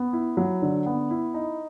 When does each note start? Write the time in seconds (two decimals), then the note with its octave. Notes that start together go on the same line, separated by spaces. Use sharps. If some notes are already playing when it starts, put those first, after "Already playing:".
Already playing: B3
0.13 E4
0.37 F#3
0.62 D3
0.86 B3
1.11 E4
1.34 D#4